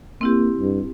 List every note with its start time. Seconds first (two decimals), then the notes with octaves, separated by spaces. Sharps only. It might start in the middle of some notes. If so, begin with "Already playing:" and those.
0.21 A#3 C4 E4 G4
0.59 G2